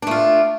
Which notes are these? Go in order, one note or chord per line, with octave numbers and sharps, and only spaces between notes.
A3 D4 F4